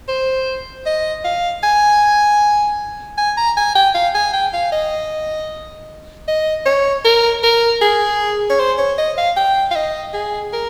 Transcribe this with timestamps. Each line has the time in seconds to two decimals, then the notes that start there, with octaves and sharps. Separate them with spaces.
0.08 C5
0.86 D#5
1.24 F5
1.63 G#5
3.18 G#5
3.37 A#5
3.57 G#5
3.75 G5
3.95 F5
4.15 G#5
4.33 G5
4.53 F5
4.72 D#5
6.28 D#5
6.66 C#5
7.05 A#4
7.43 A#4
7.82 G#4
8.50 C#5
8.59 C5
8.78 C#5
8.98 D#5
9.17 F5
9.37 G5
9.71 F5
9.75 D#5
10.13 G#4
10.53 A#4